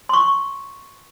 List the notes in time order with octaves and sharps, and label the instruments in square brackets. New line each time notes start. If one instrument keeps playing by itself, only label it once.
[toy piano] C6 C#6